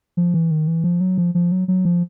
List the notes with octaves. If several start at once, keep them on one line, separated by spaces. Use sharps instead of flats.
F3
E3
D#3
E3
F3
F#3
F3
F3
F#3
F#3
F3